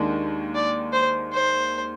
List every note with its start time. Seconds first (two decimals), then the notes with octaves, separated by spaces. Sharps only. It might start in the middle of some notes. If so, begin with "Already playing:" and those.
Already playing: D#2 D#3 G#3 D4
0.55 D5
0.93 C5
1.33 C5